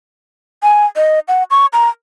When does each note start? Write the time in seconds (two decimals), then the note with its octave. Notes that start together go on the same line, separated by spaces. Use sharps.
0.63 G#5
0.97 D#5
1.28 F#5
1.51 C#6
1.73 A#5